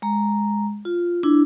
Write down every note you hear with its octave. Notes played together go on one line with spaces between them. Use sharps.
G#3 A#5
F4
D4 E4